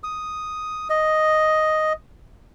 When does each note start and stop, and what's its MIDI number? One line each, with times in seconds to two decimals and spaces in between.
0.04 0.88 87
0.90 1.93 75